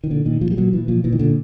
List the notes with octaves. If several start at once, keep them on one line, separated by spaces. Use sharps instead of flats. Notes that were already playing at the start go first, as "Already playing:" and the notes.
D#3
A#2 D3
A#2 D#3
A#2 F3
G3
A#2 F#3
A#2 E3
A#2 F3
A#2 E3
D#3
A#2 D3